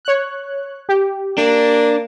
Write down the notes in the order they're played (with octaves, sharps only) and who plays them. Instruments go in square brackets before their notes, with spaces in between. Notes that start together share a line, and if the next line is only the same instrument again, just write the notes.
[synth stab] C#5 F#6
G4
[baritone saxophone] A#3 [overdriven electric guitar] D4